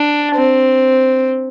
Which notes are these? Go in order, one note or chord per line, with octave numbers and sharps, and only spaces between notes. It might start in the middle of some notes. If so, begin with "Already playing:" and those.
Already playing: D4
C4